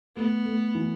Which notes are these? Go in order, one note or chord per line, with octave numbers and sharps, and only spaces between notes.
A3 B3
A3
E3